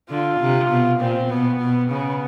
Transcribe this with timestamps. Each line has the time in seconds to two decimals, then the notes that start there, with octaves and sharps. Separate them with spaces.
0.10 D3 F4
0.40 C3
0.70 B2
1.00 A#2 C4
1.30 B2 B3
1.60 B2
1.91 C#3 B3